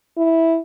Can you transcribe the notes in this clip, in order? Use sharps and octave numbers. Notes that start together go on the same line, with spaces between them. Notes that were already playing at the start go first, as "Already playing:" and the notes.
E4